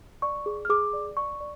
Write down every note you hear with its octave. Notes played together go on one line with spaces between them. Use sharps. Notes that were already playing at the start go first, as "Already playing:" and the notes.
D5 C#6
G#4
F6
G#4 D6
D5
D5 C#6
D5